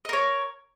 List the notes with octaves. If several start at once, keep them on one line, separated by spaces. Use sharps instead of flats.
A#4 C#5 D#5